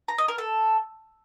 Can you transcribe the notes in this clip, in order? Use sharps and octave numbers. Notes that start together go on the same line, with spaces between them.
A#5
D#5
A#4
A4